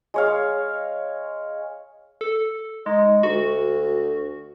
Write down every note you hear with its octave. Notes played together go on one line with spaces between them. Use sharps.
G#3 C#5 F5
A4
G#3 D#4
D2 F#4